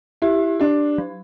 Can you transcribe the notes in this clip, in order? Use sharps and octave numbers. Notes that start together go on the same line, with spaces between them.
E4 G4
D4 G4
F#3